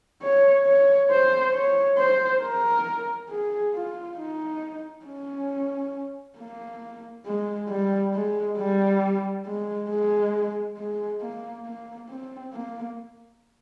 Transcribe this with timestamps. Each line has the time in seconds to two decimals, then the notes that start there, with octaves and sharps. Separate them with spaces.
0.22 C#5
0.66 C#5
1.11 C5
1.54 C#5
1.98 C5
2.43 A#4
3.30 G#4
3.74 F4
4.18 D#4
5.06 C#4
6.38 A#3
7.26 G#3
7.69 G3
8.14 G#3
8.58 G3
9.46 G#3
9.89 G#3
10.77 G#3
11.21 A#3
11.66 A#3
12.09 C4
12.53 A#3